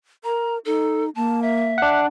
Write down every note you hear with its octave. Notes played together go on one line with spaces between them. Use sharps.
A#4 A#5
D#4 A4
A#3 A5
E5
D4 F#5